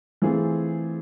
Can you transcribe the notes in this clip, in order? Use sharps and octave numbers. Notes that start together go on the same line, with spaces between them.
E3 A3 C4 F4 G#4